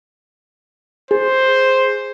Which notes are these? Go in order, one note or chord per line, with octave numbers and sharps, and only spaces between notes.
G#4 C5